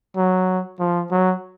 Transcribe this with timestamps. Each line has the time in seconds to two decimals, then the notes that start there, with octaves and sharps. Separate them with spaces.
0.16 F#3
0.79 F3
1.12 F#3